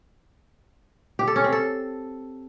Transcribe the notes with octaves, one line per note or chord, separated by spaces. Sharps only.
G4
A4
C#4
C4
A4